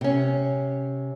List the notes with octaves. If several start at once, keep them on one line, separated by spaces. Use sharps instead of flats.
C3 C#4